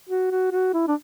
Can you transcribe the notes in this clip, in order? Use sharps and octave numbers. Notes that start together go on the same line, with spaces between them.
F#4
F#4
F#4
E4
D4